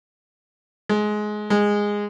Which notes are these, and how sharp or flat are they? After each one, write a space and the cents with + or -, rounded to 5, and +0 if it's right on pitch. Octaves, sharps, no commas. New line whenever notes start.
G#3 +20
G#3 -10